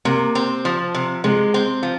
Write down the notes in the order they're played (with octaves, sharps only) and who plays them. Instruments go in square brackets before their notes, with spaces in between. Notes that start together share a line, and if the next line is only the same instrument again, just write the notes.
[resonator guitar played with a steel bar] C3 [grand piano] A#3
[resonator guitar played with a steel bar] C4
F3
C3
[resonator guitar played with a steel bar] C3 [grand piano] G#3
[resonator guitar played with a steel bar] C4
F3